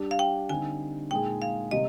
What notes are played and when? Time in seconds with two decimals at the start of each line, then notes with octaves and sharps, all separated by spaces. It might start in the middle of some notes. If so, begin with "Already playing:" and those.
Already playing: G3 D4 G4
0.11 F5
0.19 G5
0.49 D3 G3 C4 D#4 G#5
1.11 A#2 G#3 D#4 G#4 G5
1.42 F5
1.71 C3 G3 A#3 D#5